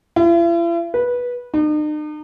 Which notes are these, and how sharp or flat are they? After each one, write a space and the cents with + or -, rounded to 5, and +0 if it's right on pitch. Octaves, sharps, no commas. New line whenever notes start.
E4 +45
B4 -15
D#4 -45